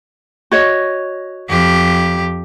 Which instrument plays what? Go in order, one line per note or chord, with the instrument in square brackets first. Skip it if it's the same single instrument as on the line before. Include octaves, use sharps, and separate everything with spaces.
[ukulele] F#4 C#5 D#5
[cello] F2 G4